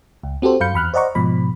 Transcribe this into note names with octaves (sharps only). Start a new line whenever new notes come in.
C#2
C4 F#4 G4 A4 C5
F#2 F5 B5 G6 C#7
E2 B5 F6 F#6
C5 D5 D#5 F#5 A#5 C#6
G#2 B2 F3 B5